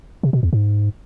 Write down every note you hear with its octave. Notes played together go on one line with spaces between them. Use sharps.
C3
B2
E2
G#2